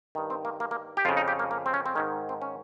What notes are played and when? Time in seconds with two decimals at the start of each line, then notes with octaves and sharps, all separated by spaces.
0.15 G2 D#3
0.30 C4
0.45 A#3
0.60 A#3
0.71 A#3
0.97 G4
1.05 F2 F4
1.09 C#3
1.17 D#4
1.28 G4
1.39 A#3
1.51 A#3
1.66 C4
1.74 C#4
1.86 C4
1.95 G#2 D#3 C#4
2.29 C4
2.42 C#4